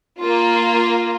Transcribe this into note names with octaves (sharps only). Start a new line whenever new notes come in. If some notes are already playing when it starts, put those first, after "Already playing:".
A#3 F4